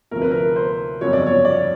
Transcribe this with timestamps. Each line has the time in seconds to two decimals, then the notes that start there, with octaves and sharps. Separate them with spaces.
0.11 D2 C3 F3 A3 A#4
0.22 B4
0.31 A#4
0.56 C5
1.01 G1 F2 C#3 F#3 B3 C#5
1.13 D5
1.26 C#5
1.45 D5